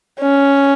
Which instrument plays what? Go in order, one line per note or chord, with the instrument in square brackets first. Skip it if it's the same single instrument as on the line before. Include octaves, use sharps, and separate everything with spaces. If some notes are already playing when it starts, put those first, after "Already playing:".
[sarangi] C#4